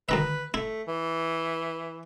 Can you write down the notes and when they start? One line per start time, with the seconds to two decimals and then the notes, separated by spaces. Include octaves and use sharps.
0.09 D2 D#3 B4 E5
0.54 A3 E4
0.87 E3